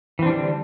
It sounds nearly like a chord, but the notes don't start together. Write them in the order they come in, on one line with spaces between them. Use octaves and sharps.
E3 C4 D4 G3 D3